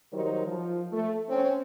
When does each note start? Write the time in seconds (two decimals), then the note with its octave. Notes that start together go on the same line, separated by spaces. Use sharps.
0.13 D#3 F#3 G3 D#4 A#4 C5
0.47 F3
0.92 A3
1.29 C4 C#4